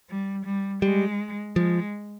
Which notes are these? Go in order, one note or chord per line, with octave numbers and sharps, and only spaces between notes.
G3
G3
G3 G#3
F3 G#3